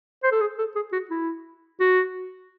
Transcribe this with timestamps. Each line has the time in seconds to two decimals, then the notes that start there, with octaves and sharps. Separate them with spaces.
0.24 C5
0.32 A4
0.41 G#4
0.58 A4
0.76 G#4
0.93 F#4
1.10 E4
1.80 F#4